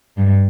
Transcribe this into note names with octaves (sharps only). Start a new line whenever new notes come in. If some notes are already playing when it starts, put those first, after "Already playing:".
G2